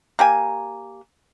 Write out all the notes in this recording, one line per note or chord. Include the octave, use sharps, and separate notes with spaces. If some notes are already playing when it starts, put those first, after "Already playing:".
A#3 G4 G#5